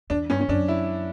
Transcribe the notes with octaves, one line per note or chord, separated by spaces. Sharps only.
E2 D4
G2 C#4
C#4
F#2 D4
E4